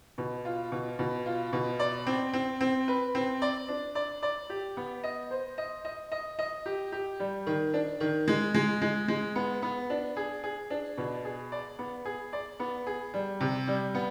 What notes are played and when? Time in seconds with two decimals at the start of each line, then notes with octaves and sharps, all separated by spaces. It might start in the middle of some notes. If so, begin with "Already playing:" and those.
0.18 B2
0.45 F4
0.72 B2
0.99 B2
1.26 F4
1.53 B2
1.79 D5
2.07 C4
2.33 C4
2.61 C4
2.88 B4
3.15 C4
3.42 D5
3.68 D4
3.95 D5
4.23 D5
4.50 G4
4.77 B3
5.04 D#5
5.31 C5
5.58 D#5
5.85 D#5
6.12 D#5
6.39 D#5
6.66 G4
6.92 G4
7.20 G3
7.47 D#3
7.74 D4
8.00 D#3
8.28 G#3
8.55 G#3
8.82 G#3
9.08 G#3
9.36 B3
9.62 B3
9.90 D4
10.17 G#4
10.44 G#4
10.70 D4
10.98 B2
11.25 G#4
11.52 D5
11.79 B3
12.05 G#4
12.33 D5
12.60 B3
12.87 G#4
13.14 G3
13.40 C3
13.68 G3
13.95 B3